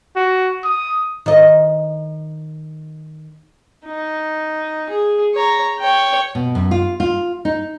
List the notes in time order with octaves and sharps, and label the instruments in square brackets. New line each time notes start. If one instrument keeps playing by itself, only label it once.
[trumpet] F#4
D#6
[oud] D#3 D#5
[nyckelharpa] D#4
G#4
C#5 A#5
C#5 G5
[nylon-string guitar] B2
F#2
F4
F4
D#4